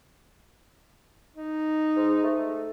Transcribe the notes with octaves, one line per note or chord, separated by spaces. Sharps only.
D#4
G#2
A3